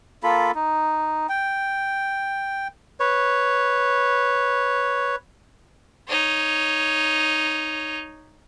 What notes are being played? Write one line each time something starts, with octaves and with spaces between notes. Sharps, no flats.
A#3 F4 A4 B5
D#4
G5
B4 C#5
D#4 C#5